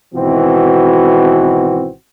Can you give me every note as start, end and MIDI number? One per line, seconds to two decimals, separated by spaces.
0.15 1.89 32
0.15 1.89 47
0.15 1.89 52
0.15 1.89 60
0.15 1.89 66